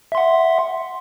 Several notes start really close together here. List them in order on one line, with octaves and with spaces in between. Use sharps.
E5 C6 F#5